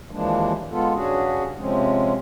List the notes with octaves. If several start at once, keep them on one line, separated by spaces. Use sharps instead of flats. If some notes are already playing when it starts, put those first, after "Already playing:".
D#2 E3 F3 G#3 A#3 D4
G#3 B3 F4 A4
G2 C#3 C#4 D4 F#4 G#4
C3 F3 G#3 C4 C#4